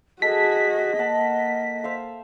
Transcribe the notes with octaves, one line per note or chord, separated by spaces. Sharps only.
F#4 G#4 A4 D#5 B6
A#3 F#5 A5
C5 E5 F5